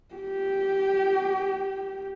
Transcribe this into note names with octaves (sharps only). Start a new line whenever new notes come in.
G4